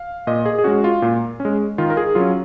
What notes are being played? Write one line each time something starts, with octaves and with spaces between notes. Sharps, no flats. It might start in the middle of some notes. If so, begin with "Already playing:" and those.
Already playing: F5
A#2 D#5
G#4
G#4
G#3 C#4 F#4
F4
A#2
C#4
G#3
D#3 F4
A#4
G#4
F#3 C#4 F4